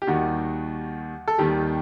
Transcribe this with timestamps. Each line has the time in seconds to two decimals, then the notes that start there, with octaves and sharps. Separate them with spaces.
0.02 G4
0.07 D#2 D#3 G3 F#4
1.28 A4
1.38 D#2 D#3 G3 G4